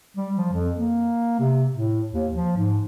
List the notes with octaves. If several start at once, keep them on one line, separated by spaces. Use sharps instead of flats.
G3
F3
F2
A#3
C3
A2
D#2
F3
G#2